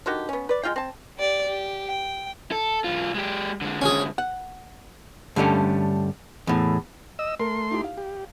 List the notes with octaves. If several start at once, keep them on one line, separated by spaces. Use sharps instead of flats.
D3 D#3 F#4 G4
B3 C#4
B4 D5
G#3 F4 F5 G5
C4 A5
G4 D5
G4
G5
A4
B1 F4
G#3 G4
D3 G#3
C#4 G#4
F#5
G2 D3 G3 A3 C#4
E2 A2
D#5 E6
A3 A#4 C6
D#4 E4 G4
F5
G4